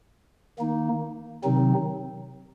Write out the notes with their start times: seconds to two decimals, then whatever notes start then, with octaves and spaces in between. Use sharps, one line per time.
0.59 D#3 A#3 D#4
1.44 C3 D#3 F#3 C4 D#4